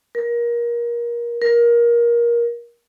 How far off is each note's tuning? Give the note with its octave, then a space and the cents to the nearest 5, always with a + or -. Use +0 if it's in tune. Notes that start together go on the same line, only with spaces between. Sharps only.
A#4 +25
A#4 +20